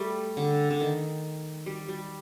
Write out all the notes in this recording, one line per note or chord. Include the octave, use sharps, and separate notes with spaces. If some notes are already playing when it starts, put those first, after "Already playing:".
Already playing: G3 A3
D3
D3
D#3
G3
G3